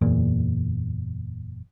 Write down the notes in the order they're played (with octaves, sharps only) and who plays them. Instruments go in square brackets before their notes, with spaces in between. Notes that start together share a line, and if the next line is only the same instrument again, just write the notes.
[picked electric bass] F#1 E2 A#2